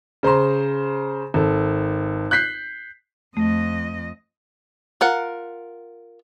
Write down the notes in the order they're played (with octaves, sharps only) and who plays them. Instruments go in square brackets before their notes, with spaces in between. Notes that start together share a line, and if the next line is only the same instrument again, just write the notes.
[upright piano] C#3 C5 A#5 C6
G#1 A4
F#6 G6 B6 C7
[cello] F2 D#5 [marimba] A3
[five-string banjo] F4 A#4 F#5